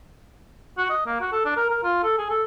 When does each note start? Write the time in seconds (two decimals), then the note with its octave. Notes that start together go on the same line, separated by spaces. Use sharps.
0.78 F#4
0.90 D#5
1.06 A#3
1.21 F#4
1.32 A4
1.45 D4
1.57 A#4
1.70 A#4
1.83 F4
2.03 A4
2.18 G#4
2.30 A4